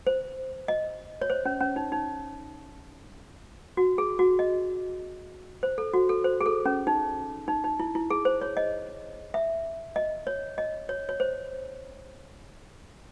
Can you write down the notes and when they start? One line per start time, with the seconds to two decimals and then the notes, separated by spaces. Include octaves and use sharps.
0.07 C5
0.68 D#5
1.22 C#5
1.30 C5
1.45 C#4
1.60 C#4
1.76 D#4
1.92 D#4
3.77 F#4
3.98 G#4
4.19 F#4
4.39 D#5
5.63 C5
5.78 A4
5.94 F#4
6.09 A4
6.24 C5
6.41 G#4
6.46 A4
6.66 C#4
6.87 D#4
7.48 D#4
7.64 D#4
7.80 E4
7.95 E4
8.11 G#4
8.25 C5
8.41 C#5
8.57 D#5
9.34 E5
9.96 D#5
10.27 C#5
10.58 D#5
10.89 C#5
11.09 C#5
11.20 C5